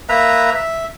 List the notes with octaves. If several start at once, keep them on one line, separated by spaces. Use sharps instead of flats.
A#3 B4 E5 A#5
E5